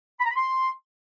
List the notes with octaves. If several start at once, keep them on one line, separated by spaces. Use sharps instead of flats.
B5
A#5
B5
C6